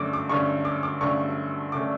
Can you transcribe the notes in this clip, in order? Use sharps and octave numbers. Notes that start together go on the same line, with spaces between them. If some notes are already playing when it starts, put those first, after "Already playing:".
Already playing: G2 D3 A3 C#4 D6
D6
G2 D3 A3 C#4 C#6
D6
D6
G2 D3 A3 C#4 C#6
D3 A3 C#4 D6